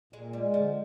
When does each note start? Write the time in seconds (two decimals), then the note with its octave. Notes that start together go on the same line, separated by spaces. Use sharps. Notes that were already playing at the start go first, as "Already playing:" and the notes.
0.13 A#2 G#3
0.33 G3 G#3
0.53 D3 F3